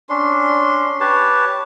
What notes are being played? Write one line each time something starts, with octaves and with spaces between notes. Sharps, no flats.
C#4 D4 C6
G4 B4 C#5 A5